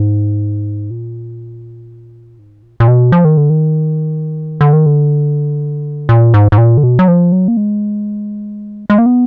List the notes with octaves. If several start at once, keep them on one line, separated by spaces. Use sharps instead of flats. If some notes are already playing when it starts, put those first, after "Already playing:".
Already playing: G#2
A#2
G#2
A#2
A#2
B2
F3
D#3
D3
D#3
D3
D#3
D3
A#2
G#2
G#2
A#2
D3
B2
F#3
F3
F#3
A#3
G#3
G#3
A#3
B3